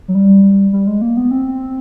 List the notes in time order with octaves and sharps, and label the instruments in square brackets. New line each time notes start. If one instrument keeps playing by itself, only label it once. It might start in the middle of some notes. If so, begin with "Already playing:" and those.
[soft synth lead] F#3
G3
G3
G#3
A#3
B3
C4